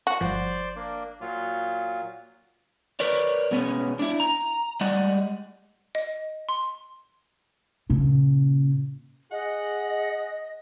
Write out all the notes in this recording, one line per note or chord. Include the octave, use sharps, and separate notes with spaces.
F#4
G1 F3 C5 D5
A#3 D4
A#2 F#3 F4
A#4 B4 C#5 D5
B2 G#3 B3 C#4
D4 E4
A#5
G3 G#3 D5 D#5 F#5
D#5
C6
A#2 C#3
G#4 D#5 F#5